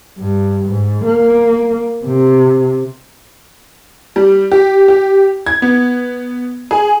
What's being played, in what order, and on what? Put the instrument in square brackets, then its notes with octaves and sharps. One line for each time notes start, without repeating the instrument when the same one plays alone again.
[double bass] G2
G#2
A#3
C3
[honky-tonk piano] G3
G4
G4
G#6
B3
G#4